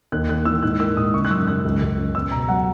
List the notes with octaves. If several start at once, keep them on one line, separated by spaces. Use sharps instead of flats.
D#2 F#6
D#2 F#6
E3 E6
G#2 F#6
A#3 E6
G#2 D#6
C#3 C#6
F#6
F#2 E6
C#3 F#6
C#2
C#2
C#4
B3 E6
B2 A#5
F#3 F#5